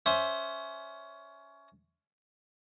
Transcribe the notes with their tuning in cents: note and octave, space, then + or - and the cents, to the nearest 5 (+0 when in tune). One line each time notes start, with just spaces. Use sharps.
C#4 +20 C5 +20 E5 +0